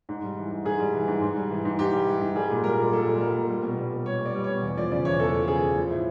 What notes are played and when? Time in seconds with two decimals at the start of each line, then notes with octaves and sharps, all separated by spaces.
0.09 G#2
0.23 G3
0.37 E3
0.51 G#2
0.65 G#2 G#4
0.80 G3
0.94 E3
1.08 G#2
1.22 G#2
1.36 G3
1.50 E3
1.65 G#2
1.79 G#2 G4
1.93 G3
2.07 E3
2.21 G#2
2.36 G3 G#4
2.50 A#2
2.64 G3 A#4
2.79 A#2
2.92 G3 A4
3.07 A#2
3.21 G3 A#4
3.35 A#2
3.49 G3
3.63 B2
3.78 G3
3.92 B2
4.06 G3 C#5
4.20 B2
4.26 D5
4.35 G3
4.44 C#5
4.49 B2
4.63 E2
4.77 F3 D5
4.91 C#3 D5
5.05 E2 C#5
5.19 E2 A4
5.33 F3
5.48 C#3 G#4
5.62 E2
5.76 F3
5.91 A2